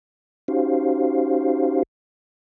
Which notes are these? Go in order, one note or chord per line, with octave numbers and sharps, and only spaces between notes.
C#4 D#4 F#4 G4 C5 F5